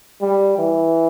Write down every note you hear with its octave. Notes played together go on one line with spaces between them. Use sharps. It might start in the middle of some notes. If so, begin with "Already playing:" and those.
G3
E3